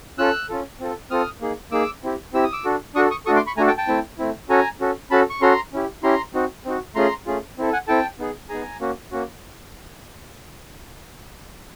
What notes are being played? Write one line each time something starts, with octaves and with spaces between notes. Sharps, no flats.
C#4 F4 A4 E6 F#6
C#4 F4 A4
C4 F4 A4
C4 F4 A4 D#6 F6
A#3 D#4 G#4
A#3 D#4 G#4 D6 E6
C4 E4 G4
C4 E4 G4 E6
D#6
D6 E6
D4 F#4 A4
D4 F#4 A4 C#6 D#6
C#6 D#6
A3 D4 F#4 A4 C#6 D#6
C6 D6
B5 C#6
A3 D4 F#4 A4 G#5 A#5
G5 A5
G5 A5
A3 C4 E4
A3 C4 E4
C#4 F#4 A4 G#5 A#5
C#4 F#4 A4
C#4 F#4 A4 A5 B5
C#6
C#4 F#4 A4 A#5 C6
C#4 E4 G4
C#4 E4 G4 A#5 C6
C4 D#4 F#4
C4 D#4 F#4
A3 C#4 F4 G#4 A#5 C6
A3 C#4 F4 G#4
C4 E4 A4
F#5 G#5
C4 E4 A4 G5 A5
B3 D#4 G#4
B3 D#4 G#4 G#5 A#5
A#3 C#4 F#4
A#3 C#4 F#4